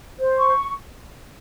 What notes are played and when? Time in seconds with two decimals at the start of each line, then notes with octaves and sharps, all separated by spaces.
0.19 C5
0.38 C#6